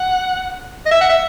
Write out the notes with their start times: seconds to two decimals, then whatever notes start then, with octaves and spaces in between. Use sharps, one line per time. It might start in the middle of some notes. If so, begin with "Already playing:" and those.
Already playing: F#5
0.86 D#5
0.91 E5
1.01 F#5
1.10 E5